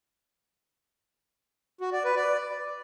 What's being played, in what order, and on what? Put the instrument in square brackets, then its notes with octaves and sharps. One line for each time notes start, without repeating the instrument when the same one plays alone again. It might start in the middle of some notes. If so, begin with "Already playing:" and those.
[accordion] F#4
D5
B4
D5